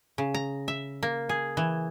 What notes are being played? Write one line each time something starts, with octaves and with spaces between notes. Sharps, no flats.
C#3
A#5
E5
A#3
G#4
E3